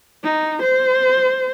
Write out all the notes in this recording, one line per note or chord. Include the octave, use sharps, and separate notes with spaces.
D#4
C5